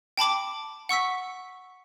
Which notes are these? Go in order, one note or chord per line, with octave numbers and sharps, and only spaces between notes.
G5 A5 B5 D6
F#5 C#6 E6 B6